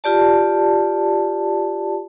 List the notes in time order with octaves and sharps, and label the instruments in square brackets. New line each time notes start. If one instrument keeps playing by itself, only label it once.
[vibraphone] F4 G4 D5 A5